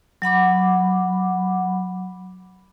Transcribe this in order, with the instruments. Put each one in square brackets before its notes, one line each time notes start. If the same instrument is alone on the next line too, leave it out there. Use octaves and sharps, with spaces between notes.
[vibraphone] F#3 F#5 B5 D6